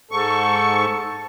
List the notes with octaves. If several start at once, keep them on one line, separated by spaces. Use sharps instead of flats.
G#2 A4 C#6